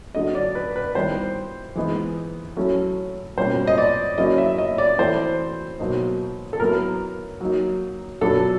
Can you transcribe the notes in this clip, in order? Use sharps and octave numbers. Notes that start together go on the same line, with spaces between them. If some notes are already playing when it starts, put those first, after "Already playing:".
D3 F#3 A3 D4 D#5
D5
B4
B4
D#3 G3 B3 E4 C5
E3 G#3 B3 D#4
F#3 A3 C#4 E4
B2 G3 A#3 C#4 F4 C5
D#5
D5
F#3 A#3 C#4 E4 D#5
E5
D#5
D5
E3 A3 C4 E4 C5
B2 F#3 A#3 D#4
A4
F#3 B3 E4 A#4
F#3 A#3 D#4
B2 F#3 B3 D4 F4 A4